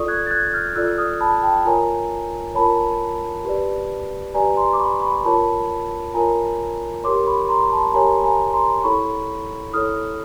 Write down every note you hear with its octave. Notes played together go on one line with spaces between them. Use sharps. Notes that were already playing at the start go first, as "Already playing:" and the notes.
Already playing: F4 A4 D5 C#6 D#6
F#6 G#6
A6
F#6 G#6
F6 G6
F4 A4 D5 E6 F#6
D#6 F6
A5 B5
G5 A5
F4 A#4 C#5 G#5 A#5
F4 A#4 C#5 A5 B5
G4 B4 D5
G4 B4 D5 G#5 A#5
A#5 C6
D6
B5 C#6
B5 C#6
F4 A#4 C#5 A5 B5
F4 A#4 C#5 G#5 A#5
G4 A#4 C#5 C6 D6
B5 C#6
A#5 C6
A5 B5
G4 A#4 C#5 G#5 A#5
G#5 A#5
A#5 C6
E4 A4 C#5 B5 C#6
E4 A4 C#5 D#6 F6